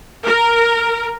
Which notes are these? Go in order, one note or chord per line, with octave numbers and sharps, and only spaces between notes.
A#4